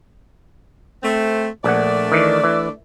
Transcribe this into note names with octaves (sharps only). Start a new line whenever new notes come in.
A3 C4
A#1 A3 D4 D5 F#5
D#3 E3
E3